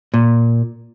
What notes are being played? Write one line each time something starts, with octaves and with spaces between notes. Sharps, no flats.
A#2